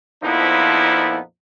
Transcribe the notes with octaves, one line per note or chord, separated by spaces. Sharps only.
F2 A#2 F3 B3 D#4 E4